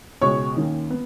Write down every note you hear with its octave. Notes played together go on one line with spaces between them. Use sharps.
C#2 B2 G#3 C#5 C#6
D#2 D#3 A#3 C#4
B3